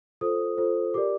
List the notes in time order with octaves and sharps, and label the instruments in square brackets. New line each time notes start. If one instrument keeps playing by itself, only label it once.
[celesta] F4 A4 C5 D#6
F4 A4 C5
G4 A#4 D5 D6